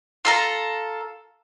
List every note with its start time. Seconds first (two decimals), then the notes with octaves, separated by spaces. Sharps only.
0.25 F4 A4 A#5